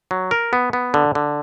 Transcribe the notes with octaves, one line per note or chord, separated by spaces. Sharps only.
F#3
A#4
B3
B3
D3
D3